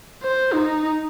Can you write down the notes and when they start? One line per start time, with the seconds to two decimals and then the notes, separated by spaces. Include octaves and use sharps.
0.22 C5
0.53 D#4